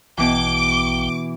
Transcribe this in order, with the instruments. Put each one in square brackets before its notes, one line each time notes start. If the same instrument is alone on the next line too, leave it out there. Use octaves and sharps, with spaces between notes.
[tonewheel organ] A#1 G5 [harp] B2 E3 [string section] D6